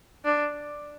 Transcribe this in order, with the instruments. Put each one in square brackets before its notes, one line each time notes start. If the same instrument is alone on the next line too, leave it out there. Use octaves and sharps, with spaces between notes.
[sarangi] D4